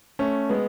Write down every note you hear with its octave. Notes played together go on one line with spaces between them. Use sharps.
A3 C#4
G#3 B3